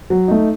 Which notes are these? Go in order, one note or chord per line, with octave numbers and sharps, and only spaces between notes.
F#3
A3 D#4